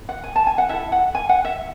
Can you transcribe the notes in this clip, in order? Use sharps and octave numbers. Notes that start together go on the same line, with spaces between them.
F#5
G#5
A5
G#5
F#5
E4 A4 E5
F#5
G#5
F#5
E5